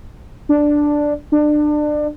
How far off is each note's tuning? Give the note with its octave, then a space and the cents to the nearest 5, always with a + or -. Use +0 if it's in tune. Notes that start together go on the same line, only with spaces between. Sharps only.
D4 +0
D4 +25